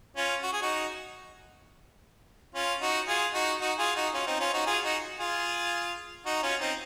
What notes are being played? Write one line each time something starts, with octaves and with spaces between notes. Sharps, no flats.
C#4 F4
F#4
G#4
D#4 F#4
C#4 F4
D#4 F#4
F4 G#4
D#4 F#4
D#4 F#4
F4 G#4
D#4 F#4
C#4 F4
C4 D#4
C#4 F4
D#4 F#4
F4 G#4
D#4 F#4
F4 G#4
D#4 F#4
C#4 F4
C4 D#4